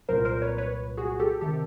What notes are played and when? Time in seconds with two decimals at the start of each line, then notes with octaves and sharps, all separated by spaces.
0.09 C2 A#2 F#3 A#4 C5
0.25 A#4 C5
0.42 B4 C#5
0.58 B4 C#5
0.97 F#4 G#4
1.19 G4 A4
1.41 C3 D#3 G4 A4